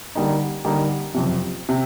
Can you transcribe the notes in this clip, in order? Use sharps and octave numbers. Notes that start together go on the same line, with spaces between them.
D3 G3 A#3 D#4
D3 G3 A#3 D#4
F#1 F2 C3
C3